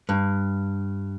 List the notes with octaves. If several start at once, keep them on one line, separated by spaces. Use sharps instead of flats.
G2